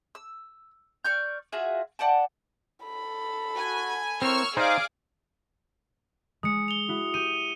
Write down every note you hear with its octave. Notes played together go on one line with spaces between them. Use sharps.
E6
D5 C#6 F6 G6
F4 F#4 G#4 E5
D5 F#5 G5 A5
A4 B5
F#4 G#5
C4 E4 A#4 C#5 C#6 E6 F6
D#4 G#4 C5 D5 F5 D6
G#3 D#6 C#7
F7 G7
E4 F#4
G4 D#7